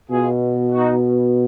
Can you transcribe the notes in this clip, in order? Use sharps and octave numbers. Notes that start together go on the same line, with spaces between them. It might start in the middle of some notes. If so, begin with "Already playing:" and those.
B2 F4 G#4
D#4 F#4